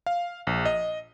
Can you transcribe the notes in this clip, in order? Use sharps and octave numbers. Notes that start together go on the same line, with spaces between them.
F5
A#1
D#5